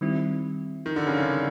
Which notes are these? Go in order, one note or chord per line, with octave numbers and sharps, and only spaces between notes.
D#3 G3 C4 E4
D#3
D3
C#3
D3